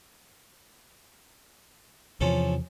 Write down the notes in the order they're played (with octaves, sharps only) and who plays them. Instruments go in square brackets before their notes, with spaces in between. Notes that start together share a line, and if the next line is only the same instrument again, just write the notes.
[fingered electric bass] E2 C3 E3 [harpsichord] F3 C#4 A4